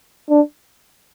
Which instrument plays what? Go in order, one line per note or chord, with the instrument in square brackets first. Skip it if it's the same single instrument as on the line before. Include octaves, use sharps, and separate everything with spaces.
[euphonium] D4